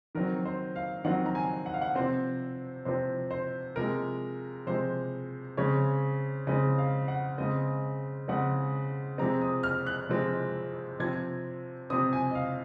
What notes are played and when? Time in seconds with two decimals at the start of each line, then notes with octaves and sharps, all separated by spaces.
0.15 D#3 F#3 C4 A#4
0.45 C5
0.76 F5
1.05 D#3 F#3 C4 F#5
1.26 A#5
1.35 G#5
1.66 F#5
1.74 F5
1.81 F#5
1.95 C3 F3 C4 C5
2.85 C3 F3 C4 C5
3.31 C5
3.76 C3 F3 G#3 A#4
4.67 C3 F3 G#3 C5
5.57 C#3 G#3 C4 C#5
6.47 C#3 G#3 C4 D#5
6.78 F5
7.08 F#5
7.38 C#3 G#3 C4 D#5
8.28 C#3 G#3 C4 F#5
9.18 C3 F3 G#3 C4 A#5
9.41 D#6
9.63 F6
9.86 F#6
10.09 C3 F3 G#3 C4
10.99 C3 F3 C4 G#6
11.90 C3 F3 C4 D#6
12.13 G#5
12.31 D#5
12.35 F5